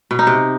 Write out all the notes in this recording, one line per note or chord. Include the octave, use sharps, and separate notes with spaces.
B2
D#4
C3